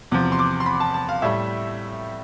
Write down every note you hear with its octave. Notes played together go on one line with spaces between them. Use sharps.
E2 C3 F3
C6
D6
C6
B5
A5
A5
F5
A2 G3 E5